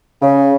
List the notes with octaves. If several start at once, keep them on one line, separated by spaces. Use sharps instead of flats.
C#3